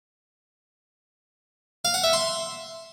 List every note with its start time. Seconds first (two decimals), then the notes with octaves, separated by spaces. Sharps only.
1.85 F5
1.94 F#5
2.04 E5
2.13 C6